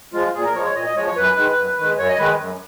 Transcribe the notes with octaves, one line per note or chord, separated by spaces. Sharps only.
F3 G#3 F4
A#2 G#4
A#4
F3 G#3 C#5
C#5
A#2 D#5
D#5
F3 G#3 C#5
C#5
F#2 B4
D#3 G#3
F#2
D#3
G#3
F#2 C#5
D#5
D#3 G#3 B4
F#2